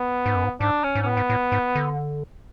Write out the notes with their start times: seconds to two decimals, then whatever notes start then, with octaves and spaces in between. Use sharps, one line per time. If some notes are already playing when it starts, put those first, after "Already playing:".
Already playing: B3
0.26 G#2
0.35 F#2
0.44 G#2
0.60 G#2 D4
0.84 C#4
0.95 G#2
1.03 C#4
1.06 A2 B3
1.17 G#2
1.30 A2
1.52 G#2
1.75 D3